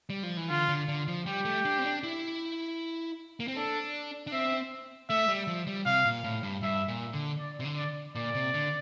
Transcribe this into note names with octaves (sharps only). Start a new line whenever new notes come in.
G3
F3
E3
D3 F4
D3
D3
F3
G3 G4
A3
D4
C4
D4
E4
A#3
C4
D4 A4
D4
C4 E5
A3 E5
G3
F3
G3
C3 F5
A#2
A2
G2
G2 E5
A#2
D3
D5
C3
D3
D5
A#2 D5
C3
D3